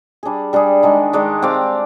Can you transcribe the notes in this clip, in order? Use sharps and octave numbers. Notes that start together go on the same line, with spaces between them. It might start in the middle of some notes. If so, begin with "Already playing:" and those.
G3 D4 G#4
G3 D4 G#4
D#3 G#3 D4
D#3 G#3 D4
C4 G4 D5 F5